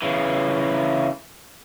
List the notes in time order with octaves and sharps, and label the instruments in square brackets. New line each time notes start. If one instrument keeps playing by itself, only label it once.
[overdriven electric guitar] C#3 E3